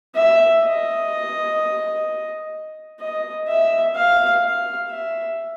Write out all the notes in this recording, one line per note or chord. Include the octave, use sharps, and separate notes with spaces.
E5
D#5
D#5
E5
F5
F5
E5